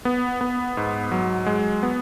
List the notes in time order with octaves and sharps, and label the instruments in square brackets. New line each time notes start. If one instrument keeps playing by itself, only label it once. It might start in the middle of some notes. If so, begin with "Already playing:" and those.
[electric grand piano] B3
B3
G#2
F#3
G#3
B3